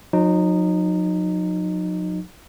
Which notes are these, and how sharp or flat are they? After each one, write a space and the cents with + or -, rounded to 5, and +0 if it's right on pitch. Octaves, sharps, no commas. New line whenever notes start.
F#3 -45 D#4 -20